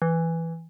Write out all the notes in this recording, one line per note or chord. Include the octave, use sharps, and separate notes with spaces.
E3